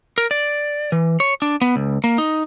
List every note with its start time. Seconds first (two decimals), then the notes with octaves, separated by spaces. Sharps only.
0.18 A#4
0.31 D5
0.92 E3
1.20 C#5
1.42 D4
1.61 B3
1.76 C#2
2.04 A#3
2.18 D#4